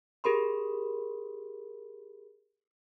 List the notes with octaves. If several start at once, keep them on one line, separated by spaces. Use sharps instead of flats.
G4 G#4 A#4 B5 C6